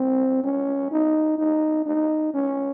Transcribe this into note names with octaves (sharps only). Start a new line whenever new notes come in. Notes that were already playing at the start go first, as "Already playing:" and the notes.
Already playing: C4
C#4
D#4
D#4
D#4
C#4